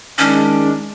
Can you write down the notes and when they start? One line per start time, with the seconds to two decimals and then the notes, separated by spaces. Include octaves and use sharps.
0.18 D#3 G#3 C#4 D4